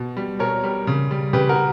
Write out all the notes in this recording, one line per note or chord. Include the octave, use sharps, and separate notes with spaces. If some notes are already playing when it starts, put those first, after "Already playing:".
Already playing: B2
G3
B2 A#4 C#5
G3
C#3
G3
C#3 G4 B4
F#4 A#4